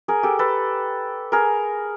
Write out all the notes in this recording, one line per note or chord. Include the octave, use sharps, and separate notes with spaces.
G#4 A#4
G4 A4
A4 B4
G#4 A#4